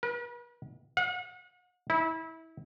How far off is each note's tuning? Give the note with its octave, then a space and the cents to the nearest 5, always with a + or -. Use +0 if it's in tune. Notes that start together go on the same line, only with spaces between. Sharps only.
B4 -45
F#5 -40
E4 -25